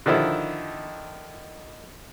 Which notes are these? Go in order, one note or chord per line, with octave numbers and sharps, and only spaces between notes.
D3 D#3 F3 D#4 E4